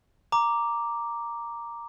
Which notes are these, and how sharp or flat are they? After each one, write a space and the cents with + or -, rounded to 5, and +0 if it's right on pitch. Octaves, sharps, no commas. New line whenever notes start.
A#5 +0 D6 +0